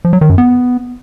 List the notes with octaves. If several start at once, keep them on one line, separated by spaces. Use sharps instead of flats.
F3
F#3
D#3
F#2
B3